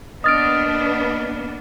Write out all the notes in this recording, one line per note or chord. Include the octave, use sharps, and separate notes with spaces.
A#3 B3 D4 D#5 D#6 F6 A6 D7